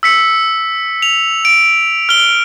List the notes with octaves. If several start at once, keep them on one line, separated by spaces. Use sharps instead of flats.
E6 B6 C#7
F7
D7
F6 G7